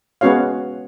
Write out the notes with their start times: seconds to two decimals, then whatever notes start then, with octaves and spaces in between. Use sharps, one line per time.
0.21 G#3 B3 C#4 F#4 C#5 F5